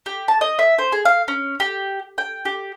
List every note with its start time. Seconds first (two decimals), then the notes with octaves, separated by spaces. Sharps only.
0.06 G4
0.28 A5
0.41 D#5
0.59 E5
0.78 C5
0.92 G#4
1.05 F5
1.28 C#4
1.60 G4
2.18 G5
2.45 G4